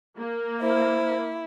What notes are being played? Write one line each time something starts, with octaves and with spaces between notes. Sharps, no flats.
A#3
E4 C5